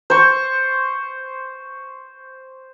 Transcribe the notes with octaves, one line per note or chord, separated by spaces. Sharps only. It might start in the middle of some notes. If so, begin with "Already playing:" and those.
C5 C#6